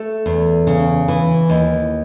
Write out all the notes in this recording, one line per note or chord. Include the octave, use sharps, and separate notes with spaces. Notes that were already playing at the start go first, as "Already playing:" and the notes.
Already playing: A3
E2
C#3
E3
D#2